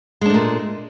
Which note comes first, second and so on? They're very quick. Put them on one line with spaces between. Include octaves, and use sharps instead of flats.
G#3 D4 A3 A#2